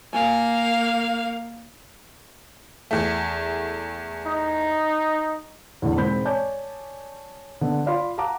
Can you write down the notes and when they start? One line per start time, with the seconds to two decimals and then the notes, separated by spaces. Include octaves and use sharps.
0.13 A#3 F5 G#5
2.91 E2 A3
4.27 D#4
5.82 E2 A2 D3
5.96 E1 G#2 C4 B5 G6
6.25 C#5 D5 G#5 A5 D6 G6
7.61 D3 B3
7.86 F4 D5 F5 B5 C6
8.18 F5 F#5 A5 A#5 D6